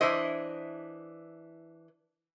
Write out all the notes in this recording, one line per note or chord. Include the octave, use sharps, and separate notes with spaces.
E3 D4 E4 C5 D#5